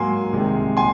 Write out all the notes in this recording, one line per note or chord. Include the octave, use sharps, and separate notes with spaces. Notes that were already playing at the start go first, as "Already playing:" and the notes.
Already playing: G#2 F#3 A#3 G#5 C6
C2 C3 D#3 G#3
A#2 G#5 C6